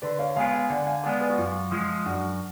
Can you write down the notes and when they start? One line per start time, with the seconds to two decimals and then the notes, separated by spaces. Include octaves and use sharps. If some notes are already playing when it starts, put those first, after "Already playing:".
0.02 D3 B4 D5
0.19 C#5 F5
0.36 G#3 B3 F4 G#4 F5 G#5
0.53 F5 G#5
0.70 D3 D5 F#5
0.87 F5 G#5
1.04 G#3 B3 F4 G#4 D5 F#5
1.21 B4 D5
1.30 F#4
1.38 F#2 F4
1.71 F3 G#3 F4
2.06 F#2 D4 F#4